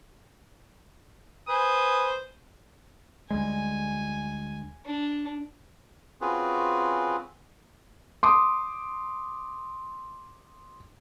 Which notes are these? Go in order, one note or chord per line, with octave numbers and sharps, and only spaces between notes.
B4 C5 G#5 D#6
D2 G3 G#3 G#5
D4
C4 C#4 F4 F#4 G#4 B4
C6 D6 D#6